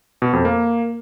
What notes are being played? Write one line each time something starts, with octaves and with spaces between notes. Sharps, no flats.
B2
F2
A#3